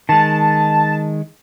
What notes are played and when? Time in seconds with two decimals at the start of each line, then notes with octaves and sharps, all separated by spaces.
0.09 D#3 G#3 A5